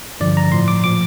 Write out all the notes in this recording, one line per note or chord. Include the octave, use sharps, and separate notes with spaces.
G2 D3 F3 D5
A#5
A2 F3 C6
D6
A#2 F3 D6